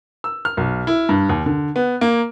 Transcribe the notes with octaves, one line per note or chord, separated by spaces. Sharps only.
E6
F6
B1
E4
G2
D#2
D3
B3
A#3